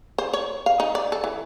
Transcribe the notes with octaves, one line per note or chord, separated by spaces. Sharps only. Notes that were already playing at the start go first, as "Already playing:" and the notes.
C5
C#5
F5
D#4
D5
A4
E3